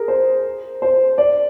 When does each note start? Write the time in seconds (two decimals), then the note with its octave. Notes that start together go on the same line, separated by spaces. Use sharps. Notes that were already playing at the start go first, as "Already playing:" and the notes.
Already playing: G#4 A#4
0.08 C5
0.82 C5
1.18 D5